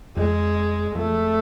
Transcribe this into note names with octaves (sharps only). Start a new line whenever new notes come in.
F2 G#3
F2 A3